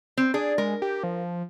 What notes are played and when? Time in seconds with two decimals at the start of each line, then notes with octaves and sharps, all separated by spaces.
0.17 C4
0.34 D4 G#4
0.58 G#3 A#4
0.82 G4
1.03 F3